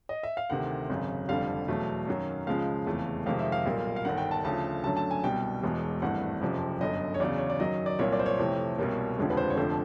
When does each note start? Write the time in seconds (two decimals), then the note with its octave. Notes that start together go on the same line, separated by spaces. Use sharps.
0.09 D#5
0.23 E5
0.37 F5
0.50 D2 C3 D#3 F#5
0.89 G#1 F#2 C#3
1.29 F1 F2 D3 G3 F5
1.68 E2 B2 F#3 A3
2.07 F#2 D#3 F#3
2.47 C#2 C#3 F3 G#3 F5
2.87 F1 E2 C#3 E3 A3
3.26 F2 C3 D#3 G#3 F5
3.39 E5
3.52 F5
3.66 B1 A#2 G3 A#3
3.96 F5
4.05 G1 G2 D#3 F#5
4.18 G5
4.31 A5
4.44 D2 C#3 F3 A5
4.83 F#2 D3 F#3 A3 A5
4.97 A5
5.11 G#5
5.24 C2 B2 G3 G5
5.63 E1 E2 B2 G#3
6.02 G#1 G2 E3 A3 F#5
6.42 F#1 F2 C3 F3
6.81 G1 F#2 D3 D#5
7.14 C#5
7.20 E2 C#3 F#3 D5
7.38 C#5
7.50 D5
7.60 F#2 D#3 F#3 D#5
7.86 D5
7.99 C2 A#2 F#3 A#3 C#5
8.13 D5
8.19 C5
8.26 C#5
8.39 F2 C3 E3 A3
8.78 C2 B2 G3 A#3
9.18 F1 D#2 D3 F3 G#3
9.30 B4
9.37 C5
9.50 C#5
9.57 F1 F2 D3 F3 A3 C5